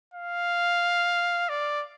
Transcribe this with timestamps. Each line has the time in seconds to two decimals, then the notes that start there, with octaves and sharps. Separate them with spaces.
0.14 F5
1.49 D5